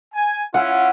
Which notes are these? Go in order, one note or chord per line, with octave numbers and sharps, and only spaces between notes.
G#5
C#4 E4 F4 F#5 G#5